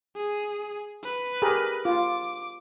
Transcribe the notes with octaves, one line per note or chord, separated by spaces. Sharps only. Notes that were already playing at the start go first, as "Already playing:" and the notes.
G#4
B4
G4 G#4 A#4
F4 D6